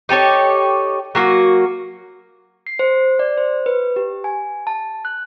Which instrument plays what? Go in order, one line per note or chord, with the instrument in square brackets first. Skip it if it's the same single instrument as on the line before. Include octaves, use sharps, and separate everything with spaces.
[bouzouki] D#4 G4 A4 C#5
F#3 A#3 F#4
[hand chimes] C7
C5
D5
C5
B4
G4
G#5
A5
F#6